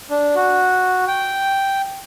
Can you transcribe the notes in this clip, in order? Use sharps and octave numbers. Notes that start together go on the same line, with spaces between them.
D4
F#4
G5